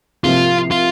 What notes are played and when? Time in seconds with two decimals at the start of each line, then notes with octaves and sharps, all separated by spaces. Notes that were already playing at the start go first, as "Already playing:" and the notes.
0.24 C2 C3 F3 A#3 F4
0.71 F4